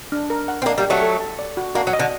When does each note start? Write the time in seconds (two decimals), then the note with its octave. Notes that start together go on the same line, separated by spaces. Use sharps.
0.12 D4
0.30 A#4
0.48 F#5
0.62 C4
0.66 A#3 D4 D#5
0.78 G3 A#3
0.84 G4
0.90 F#3 A3
1.02 A4
1.20 A5
1.39 D5
1.57 F#4
1.75 A#3 D4 F#4
1.87 F#3
1.93 D#5
1.99 D3